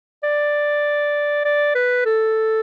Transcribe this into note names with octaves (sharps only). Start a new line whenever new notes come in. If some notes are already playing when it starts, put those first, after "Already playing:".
D5
D5
B4
A4